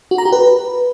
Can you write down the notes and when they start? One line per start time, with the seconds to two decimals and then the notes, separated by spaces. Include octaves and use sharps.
0.11 F#4
0.18 A#5
0.25 G4
0.32 B4